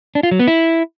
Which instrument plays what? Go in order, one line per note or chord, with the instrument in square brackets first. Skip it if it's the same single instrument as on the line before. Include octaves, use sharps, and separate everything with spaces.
[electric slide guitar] D4
F4
F#3
B3
E4